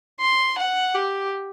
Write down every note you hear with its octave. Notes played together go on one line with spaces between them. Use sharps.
C6
F#5
G4